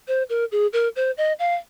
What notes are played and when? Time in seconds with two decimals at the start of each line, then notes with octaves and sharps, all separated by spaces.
0.08 C5
0.30 A#4
0.52 G#4
0.73 A#4
0.96 C5
1.18 D#5
1.39 F5